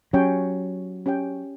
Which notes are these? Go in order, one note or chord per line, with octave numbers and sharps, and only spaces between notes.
F#3 C#4 G4 C#5 G5
C#4 G4 C#5 G5